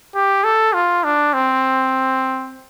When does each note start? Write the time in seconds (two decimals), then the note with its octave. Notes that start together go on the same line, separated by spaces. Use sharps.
0.15 G4
0.44 A4
0.74 F4
1.04 D4
1.34 C4